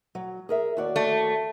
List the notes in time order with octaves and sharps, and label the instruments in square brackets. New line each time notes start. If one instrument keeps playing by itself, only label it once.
[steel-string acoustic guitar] F#3
G#4 A#4 E5
D#2 F#4 D5
[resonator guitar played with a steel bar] A3